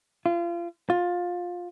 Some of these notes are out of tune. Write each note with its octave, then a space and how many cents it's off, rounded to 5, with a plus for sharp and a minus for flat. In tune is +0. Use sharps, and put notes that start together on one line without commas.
F4 -30
F4 +20